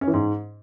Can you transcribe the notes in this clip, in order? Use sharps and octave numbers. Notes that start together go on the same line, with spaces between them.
C#4
E3
G#2